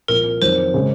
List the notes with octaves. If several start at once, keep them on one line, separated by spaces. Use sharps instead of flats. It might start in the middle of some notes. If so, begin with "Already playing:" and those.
C2 A#2 F3 C4 A#4
F2 D#3 F#3 C5
C#3 G#3